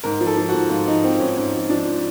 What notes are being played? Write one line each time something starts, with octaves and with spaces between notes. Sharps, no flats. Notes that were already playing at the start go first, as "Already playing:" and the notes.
G#2 A#4
F3
A4
F3
F#4
G#2
G#2 F4
F3 D#4
F3 C4
G#2 C#4
G#2 C#4
F3
F3 D4